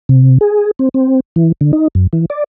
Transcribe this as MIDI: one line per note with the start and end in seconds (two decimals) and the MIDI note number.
0.09 0.38 48
0.41 0.71 68
0.79 0.89 60
0.94 1.20 60
1.36 1.52 52
1.61 1.72 50
1.73 1.88 63
1.95 2.07 42
2.13 2.25 52
2.30 2.44 74